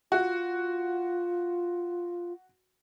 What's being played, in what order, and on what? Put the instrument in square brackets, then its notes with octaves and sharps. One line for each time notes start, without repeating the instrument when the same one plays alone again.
[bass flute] F4 [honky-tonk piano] F#4